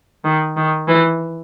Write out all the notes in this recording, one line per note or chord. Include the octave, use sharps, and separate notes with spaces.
D#3
D#3
E3